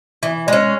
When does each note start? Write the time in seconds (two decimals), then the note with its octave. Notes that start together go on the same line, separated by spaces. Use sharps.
0.23 E3
0.48 G#3 C#4